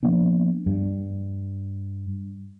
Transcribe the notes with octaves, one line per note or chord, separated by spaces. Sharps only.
F3 A#3 B3 D4
G2